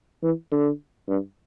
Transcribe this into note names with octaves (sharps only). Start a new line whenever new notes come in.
E3
D3
G2